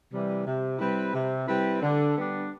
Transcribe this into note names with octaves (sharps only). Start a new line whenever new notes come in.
C3 E3 G3
C3
G3 C4 E4 B4
C3
G3 C4 E4 B4
D3
G3 B3 D4